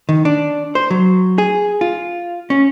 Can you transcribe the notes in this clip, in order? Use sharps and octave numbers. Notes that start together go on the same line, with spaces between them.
D#3
D4
C5
F#3
G#4
F4
C#4